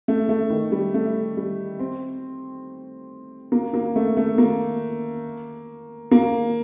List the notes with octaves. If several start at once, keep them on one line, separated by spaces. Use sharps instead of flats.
A3
A3
D#3
G3
A3
G3
C4
A#3
A#3
A3
A3
A#3
A#3